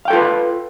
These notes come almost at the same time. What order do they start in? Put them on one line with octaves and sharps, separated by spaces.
F5 G5 A4 F4 B4